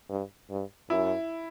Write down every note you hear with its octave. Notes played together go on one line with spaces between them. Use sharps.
G2
G2
F#2 E4